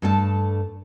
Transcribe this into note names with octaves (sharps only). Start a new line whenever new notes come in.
G2 A3 A4 G5 A5